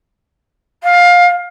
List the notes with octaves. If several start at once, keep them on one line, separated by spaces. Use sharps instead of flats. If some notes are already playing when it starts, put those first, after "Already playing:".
F5